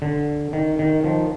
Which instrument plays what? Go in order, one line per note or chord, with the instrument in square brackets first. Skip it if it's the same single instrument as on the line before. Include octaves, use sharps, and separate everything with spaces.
[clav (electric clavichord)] D3
D#3
D#3
D#3 F3